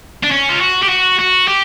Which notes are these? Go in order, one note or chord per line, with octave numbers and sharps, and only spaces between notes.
D4
C#4
F4
F#4
G4
F#4
F#4
G4